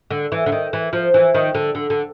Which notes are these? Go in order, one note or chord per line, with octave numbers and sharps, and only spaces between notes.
D3
E3
D3
D#3
E3
F3
E3
D#3
D3
D3
D3